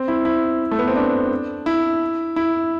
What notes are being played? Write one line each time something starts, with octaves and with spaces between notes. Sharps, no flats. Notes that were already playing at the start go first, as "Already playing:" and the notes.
Already playing: C4
E4
E4
A3
B3
C4
D4
E4
E4